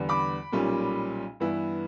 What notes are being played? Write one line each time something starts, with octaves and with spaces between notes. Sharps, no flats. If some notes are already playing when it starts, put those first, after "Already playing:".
Already playing: E2 D3 G3 B3
B5 D6
B1 A#2 G3 C#4
G2 E3 B3 E4